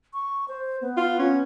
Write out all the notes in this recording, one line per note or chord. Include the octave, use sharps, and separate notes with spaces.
C#6
C5
B3
F4
C#4